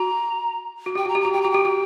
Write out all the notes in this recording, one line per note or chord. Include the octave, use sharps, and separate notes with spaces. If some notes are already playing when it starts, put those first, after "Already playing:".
Already playing: F#4 A#5
F#4
G4 G5
F#4 A#5
G4
A#5
F#4
G4 G5
F#4 A#5
G4 G5
F#4